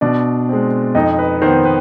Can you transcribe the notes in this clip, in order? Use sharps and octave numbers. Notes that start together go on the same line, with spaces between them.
B2 D4 D5
G#3 C4
F2 D#4 D#5
B4
D#3 B3 C5
B4